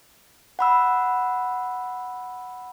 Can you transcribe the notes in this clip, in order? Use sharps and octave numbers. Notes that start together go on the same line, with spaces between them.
F#5 B5 E6